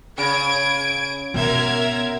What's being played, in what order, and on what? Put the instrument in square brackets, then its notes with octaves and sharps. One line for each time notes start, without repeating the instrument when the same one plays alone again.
[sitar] C#3 [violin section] G#6 D7
[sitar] F#2 [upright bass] B2 [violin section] A#4 E5 G#6